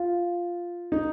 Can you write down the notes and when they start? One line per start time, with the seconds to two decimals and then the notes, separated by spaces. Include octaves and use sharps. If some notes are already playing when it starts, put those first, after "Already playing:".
Already playing: F4
0.92 D#4